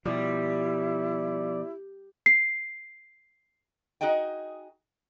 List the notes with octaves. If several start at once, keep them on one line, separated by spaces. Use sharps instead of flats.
B2 F3 G3 E4 D5
C7
D#4 F#4 G#4 D#5 G5